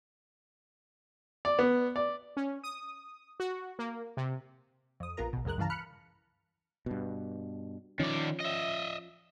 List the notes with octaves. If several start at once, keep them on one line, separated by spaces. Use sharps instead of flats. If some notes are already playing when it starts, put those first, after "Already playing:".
D5
B3
D5
C#4
D#6
F#4
A#3
C3
F2 D#6
A#1 B3 F4 A#4 A#5
A#1 B2
C#2 F#2 G#3 A#4 F#6
G2 C#3 E3 F5 A5 A#5
B5 F6 F#6 C#7
G2 B2
D#3 F3 C#4 D5
D#5 E5